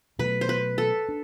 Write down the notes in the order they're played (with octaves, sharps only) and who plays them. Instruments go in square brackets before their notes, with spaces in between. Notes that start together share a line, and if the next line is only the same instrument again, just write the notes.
[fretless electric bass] B2 F#3 A3 [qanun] B4
[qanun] C5
B4
A4
[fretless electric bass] D4